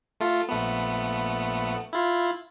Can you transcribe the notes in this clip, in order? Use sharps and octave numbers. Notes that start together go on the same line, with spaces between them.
A3 F4
A#1 A3 B3
E4 F4